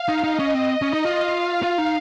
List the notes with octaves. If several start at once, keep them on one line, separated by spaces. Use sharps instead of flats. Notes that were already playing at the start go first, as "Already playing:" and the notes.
Already playing: F5
D#4
D#4 D#5
C#4
C4
C#4
D#4
F4
F5
F4
D#4